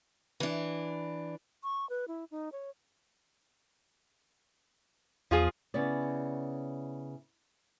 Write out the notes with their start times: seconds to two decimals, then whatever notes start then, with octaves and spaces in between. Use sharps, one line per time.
0.40 E3 D4
1.63 C#6
1.89 B4
2.08 E4
2.31 D#4
2.52 C#5
5.31 E2 F3 F4 G#4
5.74 C#3 B3 E4 D5